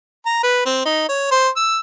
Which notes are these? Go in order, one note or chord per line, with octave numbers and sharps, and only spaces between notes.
A#5
B4
C4
D#4
C#5
C5
E6